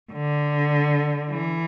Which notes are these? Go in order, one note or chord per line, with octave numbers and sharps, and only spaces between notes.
D3
E3